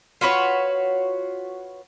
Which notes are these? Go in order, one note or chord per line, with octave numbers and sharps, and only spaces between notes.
F4 F#4 B4 C#5